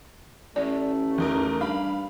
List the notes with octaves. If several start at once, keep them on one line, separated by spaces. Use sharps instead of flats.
A1 A3 D5
E2 D#4 A#4
G2 F5 B5